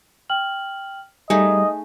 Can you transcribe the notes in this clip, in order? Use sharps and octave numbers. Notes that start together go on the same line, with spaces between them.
G5 F6 F#7
G3 A3 D#4 G#4 D#5 G#5